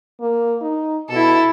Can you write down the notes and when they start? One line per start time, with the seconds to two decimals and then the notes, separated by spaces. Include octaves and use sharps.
0.21 A#3
0.62 D#4
1.10 B2 E4 A4